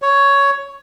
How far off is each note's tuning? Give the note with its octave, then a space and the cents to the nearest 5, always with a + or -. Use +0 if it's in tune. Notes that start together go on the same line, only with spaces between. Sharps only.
C#5 +10